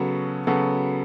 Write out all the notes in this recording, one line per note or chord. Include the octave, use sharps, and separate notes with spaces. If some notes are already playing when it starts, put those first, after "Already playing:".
Already playing: C#3 F#3 B3 F#4 A4
C#3 F#3 B3 F#4 A4